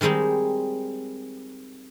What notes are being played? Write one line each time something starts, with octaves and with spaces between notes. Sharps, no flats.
D#3 G3 G#3 C4 D#4